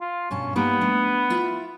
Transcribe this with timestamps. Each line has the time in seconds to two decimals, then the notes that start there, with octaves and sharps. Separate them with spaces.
0.01 F4
0.31 G2 B2 C#4 A5
0.56 G3 A#3 B3 D#4
0.81 A3 D4
1.30 E4 F4 E5